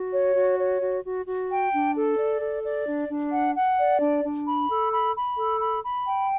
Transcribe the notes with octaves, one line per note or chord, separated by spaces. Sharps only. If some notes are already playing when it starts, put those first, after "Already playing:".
Already playing: F#4
C#5
F#4
C#5
F#4
F#4
F#4
G5
D4
A4
D5
A4
D5
D4
D4
F#5
F#5
D5
D4
D4
B5
A4
B5
B5
A4
B5
B5
G5